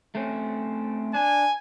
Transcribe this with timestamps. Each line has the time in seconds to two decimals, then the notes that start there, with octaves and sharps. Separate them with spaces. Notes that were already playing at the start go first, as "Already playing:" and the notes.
0.15 A3 C4 C#4
1.14 D4 G#5